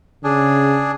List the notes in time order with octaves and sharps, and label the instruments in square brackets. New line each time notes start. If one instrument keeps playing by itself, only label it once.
[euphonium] C#3 [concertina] D4 G#4